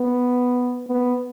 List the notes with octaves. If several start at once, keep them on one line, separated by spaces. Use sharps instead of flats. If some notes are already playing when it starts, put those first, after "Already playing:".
Already playing: B3
B3